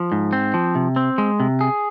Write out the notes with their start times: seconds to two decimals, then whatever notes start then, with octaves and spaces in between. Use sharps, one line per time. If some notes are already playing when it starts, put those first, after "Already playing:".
Already playing: F3
0.12 G#2
0.33 C4
0.54 F3
0.75 C3
0.96 C4
1.18 G#3
1.40 C3
1.61 G#4